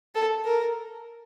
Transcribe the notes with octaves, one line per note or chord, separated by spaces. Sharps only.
A4
A#4